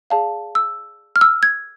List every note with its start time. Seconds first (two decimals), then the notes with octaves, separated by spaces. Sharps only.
0.10 G#4 D5 F5 A5
0.55 E6
1.16 F6
1.21 E6
1.43 G#6